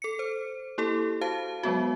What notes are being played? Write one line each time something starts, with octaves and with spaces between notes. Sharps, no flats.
A4 C#7
C5
A#3 E4 G4 A4
F#4 C5 F5 A5
F#3 G#3 B3 F#4